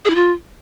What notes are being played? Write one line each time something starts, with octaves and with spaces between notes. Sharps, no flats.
G#4
E4
F4